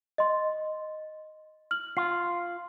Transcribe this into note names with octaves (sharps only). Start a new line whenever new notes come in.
D#5 C6
F6 F#7
F4 C7